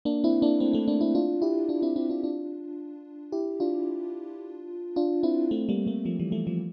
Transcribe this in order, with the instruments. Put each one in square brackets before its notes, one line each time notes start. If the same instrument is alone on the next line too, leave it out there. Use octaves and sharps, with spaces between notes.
[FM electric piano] A#3 D4
C4 E4
A#3 D4
A3 C4
A3 C4
A#3 D4
C4 E4
D4 F4
E4 G4
D4 F4
C4 E4
C4 E4
D4 F4
D4 F4
E4 G4
D4 F4
D4 F4
C4 E4
A3 C4
G3 A#3
G3 A#3
F3 A3
E3 G3
F3 A3
F3 A3